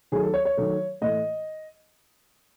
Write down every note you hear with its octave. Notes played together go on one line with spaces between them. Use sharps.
D#3 F#3 A3 G#4
A4
C#5
C#5
D#3 F#3 A3
A2 E3 A3 D#5